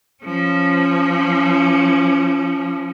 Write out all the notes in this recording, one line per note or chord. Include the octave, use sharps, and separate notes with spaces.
F3 C#4